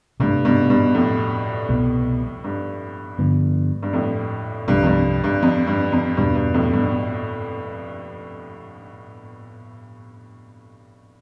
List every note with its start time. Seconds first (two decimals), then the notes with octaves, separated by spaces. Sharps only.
0.20 G2 C3 E3 A3 D4
0.45 G2 B2
0.70 G2 B2
0.94 F2 A2
1.69 C2 B2 B3
2.44 G2
3.19 G2 D3 F3 B3
3.83 G2
3.93 F2 A2
4.68 C2 G2 C3 F3
4.82 F2
4.86 G2
5.24 G2
5.43 F2
5.67 G2
5.92 F2
6.17 E2 G2 B2 G3
6.36 G2
6.54 F2 A2
6.73 G2 B2